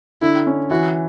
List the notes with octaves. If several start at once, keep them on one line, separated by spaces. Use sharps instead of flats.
D3 E4
C#4
E3 F#4